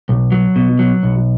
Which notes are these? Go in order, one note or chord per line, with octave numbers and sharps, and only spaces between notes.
B1
F#3
B2
F#3
B1